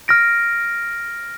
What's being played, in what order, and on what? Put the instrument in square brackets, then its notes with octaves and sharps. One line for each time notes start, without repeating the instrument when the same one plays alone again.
[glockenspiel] F6 A#6 D7